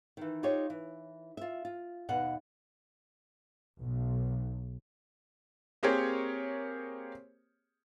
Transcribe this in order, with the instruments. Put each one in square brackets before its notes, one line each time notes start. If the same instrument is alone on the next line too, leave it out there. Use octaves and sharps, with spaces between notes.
[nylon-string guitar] D#3 E3
D#4 F4 G4 C5 C#5
E3
F4 E5
F4
D#2 B2 F5 F#5
[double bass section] B1
[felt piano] A#3 C4 G4 G#4 A#4 C#5